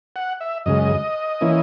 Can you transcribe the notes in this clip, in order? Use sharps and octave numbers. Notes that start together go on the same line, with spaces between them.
F#5
E5
F#2 C#3 G#3 D#5
E3 A#3 C#4 E4